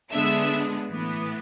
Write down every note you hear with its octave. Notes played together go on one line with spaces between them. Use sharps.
D3 G#3 B3 D4 E5
A2 E3 B3